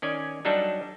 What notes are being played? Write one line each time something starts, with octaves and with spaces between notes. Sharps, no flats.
D#3 C#4 D5 G#5
F#3 G3 D4 D#4 A4